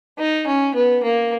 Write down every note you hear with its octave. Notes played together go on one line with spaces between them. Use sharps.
D#4
C#4
B3
A#3